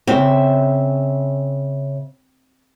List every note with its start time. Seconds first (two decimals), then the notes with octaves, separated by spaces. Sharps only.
0.07 C#3 C4 E5